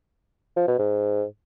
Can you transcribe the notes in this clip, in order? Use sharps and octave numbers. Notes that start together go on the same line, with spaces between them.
F3
B2
G#2